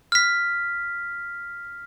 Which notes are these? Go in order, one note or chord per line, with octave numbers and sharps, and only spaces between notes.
F6 B6